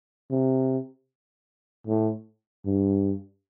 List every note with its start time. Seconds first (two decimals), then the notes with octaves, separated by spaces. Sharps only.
0.31 C3
1.87 A2
2.65 G2